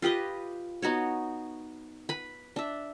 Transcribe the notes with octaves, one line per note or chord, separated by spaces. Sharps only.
F4 G4 B4 D#5
B3 D#4 F#4 C#5
B4 B5
D4 E5